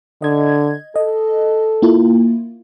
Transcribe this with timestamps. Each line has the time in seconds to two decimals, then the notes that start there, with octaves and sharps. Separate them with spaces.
0.22 D3 D#5 G#6
0.96 A4 D#5
1.82 A#3 E4 F4